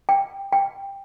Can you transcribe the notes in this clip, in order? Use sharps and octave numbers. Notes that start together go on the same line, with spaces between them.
G5
G5